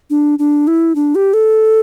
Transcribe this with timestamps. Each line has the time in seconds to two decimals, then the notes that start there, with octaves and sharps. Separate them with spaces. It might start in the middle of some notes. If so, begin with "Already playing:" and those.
0.10 D4
0.39 D4
0.67 E4
0.95 D4
1.15 G4
1.33 A4